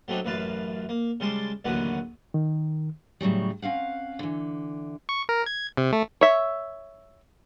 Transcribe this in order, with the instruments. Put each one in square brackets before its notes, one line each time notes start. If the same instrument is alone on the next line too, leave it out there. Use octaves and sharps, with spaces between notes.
[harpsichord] F#3 A3 C4 D4 D#4
A1 F#2 B4 F5 A5
A#3
C#3 G3 G#3 A5 C6 D6
A1 D#2 D3 F#3 F#4 B4
[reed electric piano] D#3
[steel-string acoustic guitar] A2 C#3 F#3 G3
C4 C#4 F5 F#5
D3 E3
[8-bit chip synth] C#6
A#4
G#6
C3
A3
[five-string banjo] C#5 E5